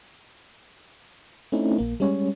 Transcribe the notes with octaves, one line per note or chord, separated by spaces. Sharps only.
A3 C4 C#4 D#4 E4
A#1 A#3
G3 G#3 C#4 C#5